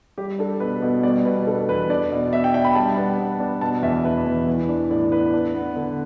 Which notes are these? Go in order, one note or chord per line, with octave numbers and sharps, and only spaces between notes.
G3 G4
D4 A4
B2 B4
B2
G3 D5
B2 B4
D4 A4
E2 B4
D4 D5
B2
D4 E5
G5
D4 G5
B5
G3 A5
B3
B3
D4
B2 A5
E2 E5
E2 B4
E2
E3
D4
A2 D5
B3 B4
D4
B3
D3